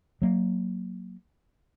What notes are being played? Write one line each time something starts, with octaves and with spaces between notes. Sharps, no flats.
F#3 A#3